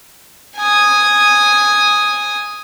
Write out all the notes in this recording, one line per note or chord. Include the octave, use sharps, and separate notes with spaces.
G#5 D#6